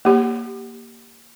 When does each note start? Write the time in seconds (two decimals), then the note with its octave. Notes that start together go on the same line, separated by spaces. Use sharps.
0.05 A#3 G4